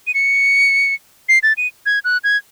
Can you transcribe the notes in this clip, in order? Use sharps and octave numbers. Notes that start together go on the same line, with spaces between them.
D#7
C#7
C7
A6
D#7
G#6
F#6
G#6